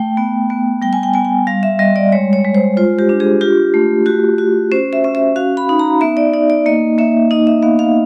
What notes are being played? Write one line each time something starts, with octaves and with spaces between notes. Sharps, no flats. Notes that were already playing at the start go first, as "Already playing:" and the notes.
Already playing: A3 G5
B3
B3
G3 G5
G#5
G5
B3 G#5
G5
G3 F5
E5
G3 D#5
D5
G#3 C#5
C#5
G#3
C5
F4 C5
G4
D4
G#4
F4 G4
A3
F#4 G4
F#4
C#4 C5
E5
C#4
E5
F#4 F5
B5
D#4
A#5
B3 E5
D5
D#4 D5
D5
A#3 D#5
A#3 E5
D#4 D#5
E5
B3 F5
F5